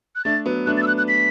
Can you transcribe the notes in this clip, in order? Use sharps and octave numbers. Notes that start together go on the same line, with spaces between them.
F#6
A3 D4 A6
F#3 B3
A3 D4 F#6
A6
E6
F#6
F#6
B6